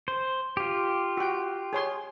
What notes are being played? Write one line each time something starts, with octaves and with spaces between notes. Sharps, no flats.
C5
F4 G4
F#4 G5
G#4 C#5 C6